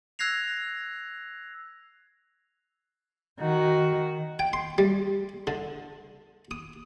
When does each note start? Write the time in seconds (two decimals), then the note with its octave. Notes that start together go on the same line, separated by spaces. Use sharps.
0.19 E6 F#6 G#6 A#6 C7 F7
3.40 D#3 F#4
4.39 G5
4.53 C6
4.78 G3
5.47 D3
6.51 D#6